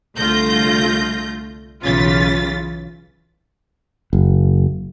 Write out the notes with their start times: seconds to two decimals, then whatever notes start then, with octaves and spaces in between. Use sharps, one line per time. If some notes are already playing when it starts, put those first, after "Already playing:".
0.18 C2 D3 A3 F4 G6 A#6
1.82 B1 C#3 E3 F4 A6 B6
4.13 F#1